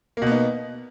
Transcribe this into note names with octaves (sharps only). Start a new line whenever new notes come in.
B2 A#3 B3 D#4